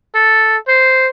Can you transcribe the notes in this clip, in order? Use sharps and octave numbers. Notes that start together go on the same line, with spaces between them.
A4
C5